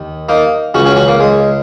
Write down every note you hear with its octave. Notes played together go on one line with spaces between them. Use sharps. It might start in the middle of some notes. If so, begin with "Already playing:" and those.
Already playing: D#2 D#3
A#3 D#4
C#2 C#3 C#4 F#4
C#4 F#4
C#4 F#4
A#3
G#3